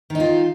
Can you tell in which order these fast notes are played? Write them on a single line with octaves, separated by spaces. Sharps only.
D#3 D#4 F4